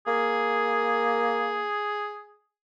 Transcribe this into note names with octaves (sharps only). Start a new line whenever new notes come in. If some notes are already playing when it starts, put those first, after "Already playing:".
A#3 G#4